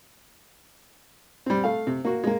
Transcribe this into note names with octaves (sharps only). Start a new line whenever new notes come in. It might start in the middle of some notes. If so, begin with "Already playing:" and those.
G3 C4
A3 F5
C3
A#3 F#4
G#3 A#3